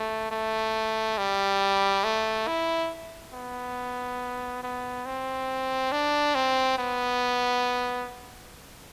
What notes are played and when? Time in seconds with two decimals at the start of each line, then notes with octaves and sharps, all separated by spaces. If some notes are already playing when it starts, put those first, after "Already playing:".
Already playing: A3
0.31 A3
1.18 G3
2.04 A3
2.47 E4
3.33 B3
4.63 B3
5.06 C4
5.92 D4
6.35 C4
6.78 B3